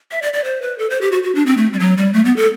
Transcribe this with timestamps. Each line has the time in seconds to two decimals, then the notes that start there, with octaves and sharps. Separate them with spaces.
0.11 E5
0.22 D5
0.33 D5
0.44 C5
0.62 B4
0.78 A4
0.90 C5
1.01 G4
1.12 F#4
1.23 F#4
1.35 D4
1.46 C4
1.57 A3
1.73 G3
1.79 F#3
1.97 G3
2.13 A3
2.25 B3
2.36 A4